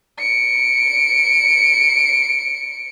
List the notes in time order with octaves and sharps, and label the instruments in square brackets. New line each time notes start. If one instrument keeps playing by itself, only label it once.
[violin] C#7 D7